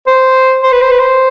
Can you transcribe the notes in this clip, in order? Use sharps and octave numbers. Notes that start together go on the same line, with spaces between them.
C5
C5
B4
C5
B4
C5